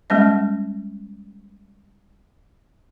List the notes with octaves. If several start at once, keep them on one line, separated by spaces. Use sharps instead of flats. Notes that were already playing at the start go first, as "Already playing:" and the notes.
G3 G#3 A#3 C#4 D#5